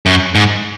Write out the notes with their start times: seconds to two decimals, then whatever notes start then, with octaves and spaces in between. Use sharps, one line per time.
0.06 F#2
0.35 G#2